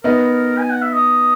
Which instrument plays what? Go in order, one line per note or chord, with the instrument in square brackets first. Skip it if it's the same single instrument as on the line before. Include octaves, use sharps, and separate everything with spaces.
[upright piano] B3 D#4 [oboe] A#4
[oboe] G#5
F#5
E5
D#5